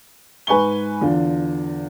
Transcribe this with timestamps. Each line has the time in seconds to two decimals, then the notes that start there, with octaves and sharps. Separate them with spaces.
0.47 G#2 B4 G#5 C#6 G7
1.01 E2 D3 F4